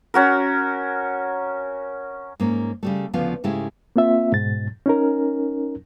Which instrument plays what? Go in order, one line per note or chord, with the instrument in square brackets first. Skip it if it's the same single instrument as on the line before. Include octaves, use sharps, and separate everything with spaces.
[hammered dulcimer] C#4 F#4 A#4
[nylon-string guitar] G#2 A#3 C#4
C#3 G3 A3
D2 C#3 F3 B3 F5
G#2 C#3 G#3 A3 E4 G4
[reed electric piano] A#3 C4 F4 E5
G#2 B2 A6
C#4 D#4 A#4